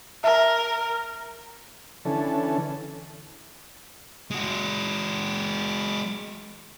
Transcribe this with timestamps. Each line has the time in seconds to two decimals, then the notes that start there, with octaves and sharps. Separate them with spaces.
0.24 A#4 E5 A#5
2.05 D3 E3 C#4 A4
4.31 G#3 F#4